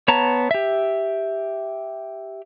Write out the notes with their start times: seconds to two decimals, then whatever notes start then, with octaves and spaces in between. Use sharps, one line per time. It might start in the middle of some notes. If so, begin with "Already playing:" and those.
0.08 B3 C#5 A5 A#5
0.51 G4 E5